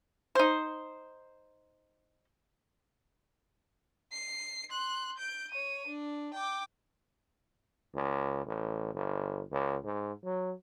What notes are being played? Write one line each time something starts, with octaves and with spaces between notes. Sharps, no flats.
D#4 C5
C7
C6 F#6
G6 D7
C#5 D#7
D4
G5 D6
C#2
A1
G1
C#2
G#2
F#3